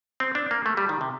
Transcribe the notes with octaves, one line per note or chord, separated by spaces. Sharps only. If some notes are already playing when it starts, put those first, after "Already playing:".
C4
D4
A#3
A3
G3
D#3
C3